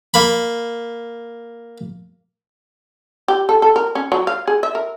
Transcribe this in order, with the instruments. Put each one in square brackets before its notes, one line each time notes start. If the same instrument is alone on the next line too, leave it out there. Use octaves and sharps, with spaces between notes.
[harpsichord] A#3 B5
[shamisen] G4
A4
A4
A#4
C#4
F#3
F5
G#4
E5
A#4